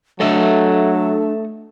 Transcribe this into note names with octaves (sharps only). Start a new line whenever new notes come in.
F#3 A3 D4 A4 D#5 E5